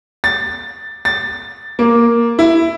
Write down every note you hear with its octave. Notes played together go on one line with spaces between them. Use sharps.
A6
A6
A#3
E4